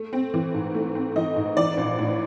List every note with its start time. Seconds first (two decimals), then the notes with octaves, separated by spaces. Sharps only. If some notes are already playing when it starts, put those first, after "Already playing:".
Already playing: A3
0.13 C4
0.34 E3
0.54 G#2
0.75 A3
0.95 C4
1.16 E3 D#5
1.36 G#2
1.57 E3 D5
1.77 A#1
1.99 A2